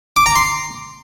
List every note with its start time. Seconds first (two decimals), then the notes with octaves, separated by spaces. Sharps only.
0.16 D6
0.26 A#5
0.36 C6